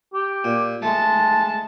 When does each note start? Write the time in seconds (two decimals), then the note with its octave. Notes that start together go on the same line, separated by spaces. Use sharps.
0.14 G4
0.44 A#2
0.82 G#3 A3 A5